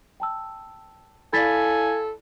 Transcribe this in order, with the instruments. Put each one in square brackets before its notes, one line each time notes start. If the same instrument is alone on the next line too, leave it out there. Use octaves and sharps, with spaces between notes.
[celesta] G5 A5 E6
[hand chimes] E4 D5 F5 [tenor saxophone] A4 [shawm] G#5 [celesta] B5 A6 B6